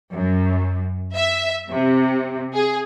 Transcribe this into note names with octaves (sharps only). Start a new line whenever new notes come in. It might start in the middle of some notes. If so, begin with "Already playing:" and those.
F#2
E5
C3
G#4